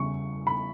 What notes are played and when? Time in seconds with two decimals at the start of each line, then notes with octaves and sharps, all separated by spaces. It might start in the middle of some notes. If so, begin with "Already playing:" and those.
Already playing: E2 C#3 G3 C#6
0.47 B5